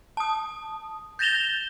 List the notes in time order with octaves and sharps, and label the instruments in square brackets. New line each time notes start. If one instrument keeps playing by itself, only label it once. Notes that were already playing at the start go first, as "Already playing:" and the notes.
[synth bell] A5 D#6
G6 A6 A#6 E7 F7 G7